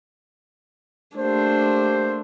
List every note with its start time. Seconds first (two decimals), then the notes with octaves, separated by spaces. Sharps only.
1.17 A3 A#3 D4 G4 C5